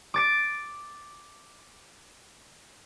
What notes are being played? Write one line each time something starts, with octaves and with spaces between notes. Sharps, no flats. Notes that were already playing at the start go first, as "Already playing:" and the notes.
D6 A6 D7